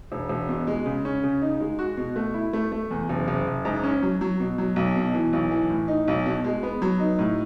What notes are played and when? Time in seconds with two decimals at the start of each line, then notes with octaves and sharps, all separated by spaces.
0.12 E1
0.29 E1
0.48 B2
0.67 G#3
0.86 C#3
1.05 C#4
1.23 C#3
1.42 D#4
1.60 G#3
1.79 F#4
1.97 B2
2.16 A3
2.34 E4
2.53 A3
2.72 A3
2.91 E2
3.09 F#1
3.28 F#1
3.47 F#1
3.65 G#2
3.84 C#4
4.03 F#3
4.21 F#3
4.40 B2
4.58 F#3
4.76 B1
4.96 B2
5.14 E3
5.33 B1
5.51 E3
5.70 A2
5.88 D#4
6.08 B1
6.26 B2
6.44 G#3
6.63 B3
6.82 F#3
7.00 D#4
7.19 A2